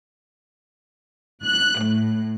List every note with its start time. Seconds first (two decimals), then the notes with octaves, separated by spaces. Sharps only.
1.44 F#6
1.83 A2